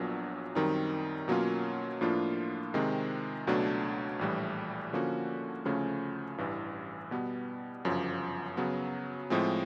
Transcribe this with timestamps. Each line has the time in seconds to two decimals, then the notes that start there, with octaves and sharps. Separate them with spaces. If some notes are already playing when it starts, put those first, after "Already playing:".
Already playing: A#1 A#2 F#3 B3 D4
0.55 F#2 D#3 G3 C4 D#4
1.28 B2 F#3 A#3 C#4 F4
2.01 A2 F3 A#3 D4 F4
2.74 C3 D#3 G#3 C4
3.47 C#2 B2 F#3 A3 D4
4.19 A#1 A2 E3 G3
4.93 D3 F3 A#3 C#4 F#4
5.65 D2 C#3 F3 A3 C#4
6.38 A1 G2 E3
7.11 B2 G3 B3
7.85 G1 F#2 C#3 F3
8.57 C#3 F#3 B3
9.30 A2 F3 G#3 C4